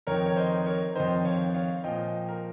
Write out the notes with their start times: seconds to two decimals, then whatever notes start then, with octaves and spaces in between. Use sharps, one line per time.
0.07 F2 D#3 A#4 C#5
0.26 C#5
0.36 C5 D#5
0.66 A#4 C#5
0.95 F2 D#3 C5 D#5
1.25 C#5 F5
1.54 C#5 F5
1.84 A#2 F3 D#5 G5
2.28 A#4